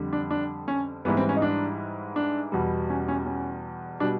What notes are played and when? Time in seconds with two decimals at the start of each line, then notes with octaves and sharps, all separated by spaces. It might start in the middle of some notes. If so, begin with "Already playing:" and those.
Already playing: F2 D3 G3
0.13 D4
0.31 D4
0.68 C#4
1.05 G#2 E3 G3 B3
1.17 C4
1.29 C#4
1.36 D#4
1.42 D4
2.16 D4
2.52 E2 B2 G3
2.90 C#4
3.08 C#4
3.26 C#4
4.00 B2 G3 D4